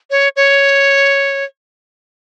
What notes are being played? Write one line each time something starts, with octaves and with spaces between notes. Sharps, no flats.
C#5
C#5